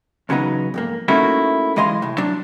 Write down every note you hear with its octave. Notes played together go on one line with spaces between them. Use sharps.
E2 C#3 F#3 B3 D#4
F2 G#2 A#3
A3 A#3 C#4 D#4 E4 F#4
B1 E3 G#3 D#5 F5 C6
A2 C3
F#3 D4